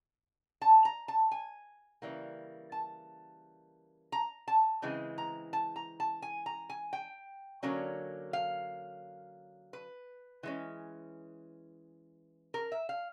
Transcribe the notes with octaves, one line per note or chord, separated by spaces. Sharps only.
A5
A#5
A5
G#5
C#3 E3 G3 A#3
A5
A#5
A5
C#3 E3 G#3 C4
A#5
A5
A#5
A5
G#5
A#5
G#5
G5
D3 F#3 A#3 C#4
F5
B4
E3 G#3 C#4
A#4
E5
F5